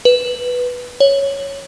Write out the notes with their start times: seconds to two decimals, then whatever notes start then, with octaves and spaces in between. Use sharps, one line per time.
0.05 B4
1.00 C#5